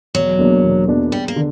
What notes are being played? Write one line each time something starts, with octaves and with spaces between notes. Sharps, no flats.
E1 F#3
E2 B2 A#3 D4
E1
E2 B2 A#3 D4
E2 G3
A#3
D3